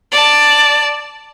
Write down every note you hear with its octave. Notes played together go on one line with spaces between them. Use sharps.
D5 A5